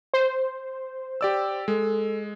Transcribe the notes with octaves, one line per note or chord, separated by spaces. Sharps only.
C5
G4 D5 E6
G#3 A4